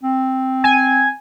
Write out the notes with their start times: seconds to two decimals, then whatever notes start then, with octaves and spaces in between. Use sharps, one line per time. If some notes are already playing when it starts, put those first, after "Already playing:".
0.04 C4
0.64 G#5